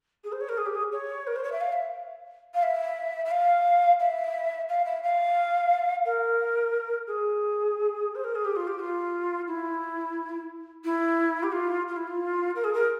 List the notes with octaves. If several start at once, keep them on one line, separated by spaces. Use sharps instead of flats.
G#4
C5
C#5
A#4
G#4
G4
G#4
C#5
A#4
C5
C#5
E5
F5
E5
F5
E5
E5
F5
E5
F5
E5
F5
A#4
G#4
C5
A#4
G#4
G4
F4
G4
F4
E4
E4
G4
F4
F4
E4
F4
A#4
G#4
A#4